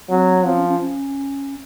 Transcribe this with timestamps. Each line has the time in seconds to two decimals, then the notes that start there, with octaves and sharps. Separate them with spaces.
0.09 F#3 C4
0.45 F3 C4
0.57 C#4
0.69 C#4
0.80 C#4